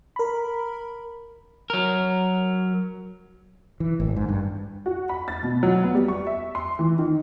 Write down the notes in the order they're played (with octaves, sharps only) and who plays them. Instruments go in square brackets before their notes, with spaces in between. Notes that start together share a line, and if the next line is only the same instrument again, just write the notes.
[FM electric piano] A#4 B5
[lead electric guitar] F#3 A#4
[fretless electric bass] E3
G#1
G#2
G2
[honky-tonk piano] F#4
B5
A6
B2
F#3
B3
G3
C#6
E5
C6
E3
D#3